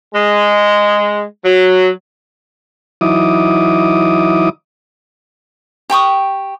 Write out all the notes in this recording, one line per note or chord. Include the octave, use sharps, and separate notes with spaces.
G#3
F#3
E3 F#3 D#4 E4 D6 D#6
G4 G5 C#6 D#6